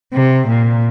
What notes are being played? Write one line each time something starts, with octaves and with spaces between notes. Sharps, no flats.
C3
A#2